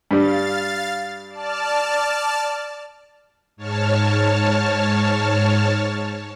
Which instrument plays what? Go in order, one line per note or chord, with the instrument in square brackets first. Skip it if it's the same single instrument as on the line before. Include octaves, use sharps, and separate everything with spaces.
[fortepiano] G2 G3 [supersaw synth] F5 A6
[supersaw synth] D5 A5 F6
[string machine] G#2 C#5 A5 F6